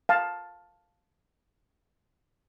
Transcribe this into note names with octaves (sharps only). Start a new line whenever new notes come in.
F5 A5